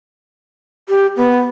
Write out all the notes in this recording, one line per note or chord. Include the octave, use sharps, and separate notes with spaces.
G4
B3